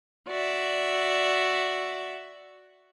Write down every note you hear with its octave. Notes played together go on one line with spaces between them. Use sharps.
F#4 D5 E5